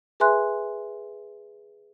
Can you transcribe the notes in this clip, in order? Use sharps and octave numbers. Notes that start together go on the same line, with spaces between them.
G#4 B4 E5 G#5 C6 F#6